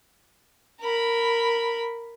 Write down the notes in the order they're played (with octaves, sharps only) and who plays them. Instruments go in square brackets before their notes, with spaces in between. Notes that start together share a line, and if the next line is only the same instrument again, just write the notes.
[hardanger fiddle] A#4 B5